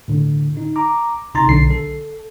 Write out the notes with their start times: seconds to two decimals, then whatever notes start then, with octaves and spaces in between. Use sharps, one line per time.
0.08 A2 D3
0.57 D#4
0.76 A#5 D6
1.34 G#1 C3 D#4 A#5 C6 A6
1.47 B1 D3 C7
1.71 A4